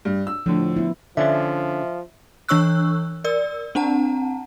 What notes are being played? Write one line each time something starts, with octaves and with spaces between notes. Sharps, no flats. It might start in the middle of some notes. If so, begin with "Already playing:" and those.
G2
E6
A2 D3 F3
B3 E4
D3 F3 C#4 D4 E5
E3 D4 C#5 C#6 E6 F#6
A#4 D5 E6
C4 D4 F#5 A5 A#5